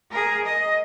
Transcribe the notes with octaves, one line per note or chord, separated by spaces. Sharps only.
G#4 A#4
D#5